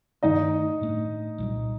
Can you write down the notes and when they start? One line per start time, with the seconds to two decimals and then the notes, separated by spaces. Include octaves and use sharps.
0.23 G2 D#3 A3 D#4 D#5
0.81 A2 A3 D4
1.38 C2 A#2 G3